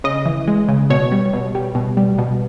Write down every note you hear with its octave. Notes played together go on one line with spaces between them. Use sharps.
C#3 D#5
E3
G#3
C#3
B2 C#5
G3
B2
G3
B2
G3
B2